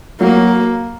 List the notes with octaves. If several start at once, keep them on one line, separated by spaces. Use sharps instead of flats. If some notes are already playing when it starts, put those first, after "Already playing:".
F#3 A#3